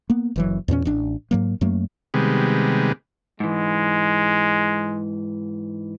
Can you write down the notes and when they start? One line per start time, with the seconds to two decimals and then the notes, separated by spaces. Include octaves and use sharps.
0.10 A#3 B3
0.36 F#1 E3 F#3
0.68 E2 A#2 C4 C#4
0.85 A1 D4
1.31 G#2 F#3 A#3
1.61 F#2 F#3 A3 A#3
2.14 C3 D#3 G3 G#3 B3
3.40 G#2 E3 G#3